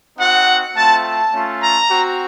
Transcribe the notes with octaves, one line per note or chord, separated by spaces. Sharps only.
C4 D#4 F#4 F#5
A3 C4 F4 A5
A5
A3 C#4 F4
A#5
C4 F#4